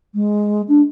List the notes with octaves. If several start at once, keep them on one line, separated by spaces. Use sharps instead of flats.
G#3
D4